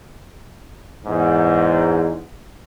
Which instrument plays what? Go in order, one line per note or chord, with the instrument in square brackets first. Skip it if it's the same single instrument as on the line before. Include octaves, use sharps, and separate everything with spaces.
[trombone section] E2 G#2